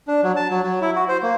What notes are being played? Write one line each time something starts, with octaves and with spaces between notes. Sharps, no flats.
D4
F#3
A5
F#3
F#3
E4
F#4
C5
A#3